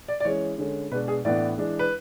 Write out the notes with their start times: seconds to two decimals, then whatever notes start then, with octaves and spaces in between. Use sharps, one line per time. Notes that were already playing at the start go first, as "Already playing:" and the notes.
0.08 D5
0.20 D5
0.25 E3 G#3 C#4 C#5
0.58 D3 G#3 C#4
0.91 B2 G#3 D4 B4
1.08 G#4
1.25 A2 E3 B3 D4 D5
1.58 E3 G#3 D4
1.79 B4